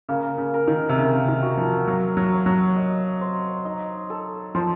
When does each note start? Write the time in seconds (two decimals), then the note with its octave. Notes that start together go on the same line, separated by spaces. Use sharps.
0.09 C#3 A#3
0.38 C#3
0.54 A#4
0.68 D#3
0.89 C3
0.98 C#3 A#4
1.28 D#3
1.42 F#4
1.57 F3
1.88 F#3 F5
2.17 F#3
2.32 C#5
2.46 F#3
2.76 D#5
3.21 C5
3.65 D#4
4.10 A4
4.55 F3 C5